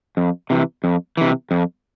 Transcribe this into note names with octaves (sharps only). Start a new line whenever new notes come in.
F2
C3 E3
F2
C3 E3
F2